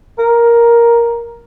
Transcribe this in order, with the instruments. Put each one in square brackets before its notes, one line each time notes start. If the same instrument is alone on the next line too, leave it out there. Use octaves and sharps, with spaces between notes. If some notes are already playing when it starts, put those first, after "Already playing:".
[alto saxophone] A#4